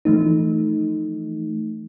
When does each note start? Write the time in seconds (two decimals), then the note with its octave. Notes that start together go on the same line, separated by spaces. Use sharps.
0.05 E3 F3 A3 D#4